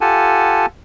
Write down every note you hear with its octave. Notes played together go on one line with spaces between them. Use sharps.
F4 G4 A4 F#5 G#5 A5